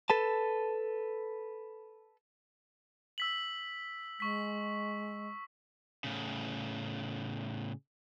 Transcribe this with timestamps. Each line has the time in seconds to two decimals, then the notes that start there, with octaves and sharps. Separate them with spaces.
0.10 A4 B4 A5
3.18 E6 B6 F#7
4.20 G#3 C#6 B6
6.04 A2 C#3